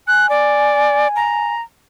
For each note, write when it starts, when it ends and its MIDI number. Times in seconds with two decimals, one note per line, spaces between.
0.08 1.53 80
0.08 0.29 90
0.29 1.08 74
1.16 1.61 82